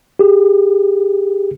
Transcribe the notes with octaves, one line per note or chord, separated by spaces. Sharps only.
G4 G#4